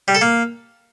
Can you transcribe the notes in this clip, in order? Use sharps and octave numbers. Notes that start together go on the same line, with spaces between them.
G3
A4
A#3